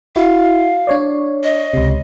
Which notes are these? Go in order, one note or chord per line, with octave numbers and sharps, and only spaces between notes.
E4 F#4 F5
D4 C#5 D5
D#5
C#2 C3